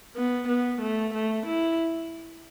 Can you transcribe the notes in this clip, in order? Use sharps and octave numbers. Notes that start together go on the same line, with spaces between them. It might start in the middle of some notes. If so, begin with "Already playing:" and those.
B3
B3
A3
A3
E4